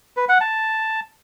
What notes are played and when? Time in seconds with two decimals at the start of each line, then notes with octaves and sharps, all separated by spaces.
0.17 B4
0.29 F#5
0.41 A5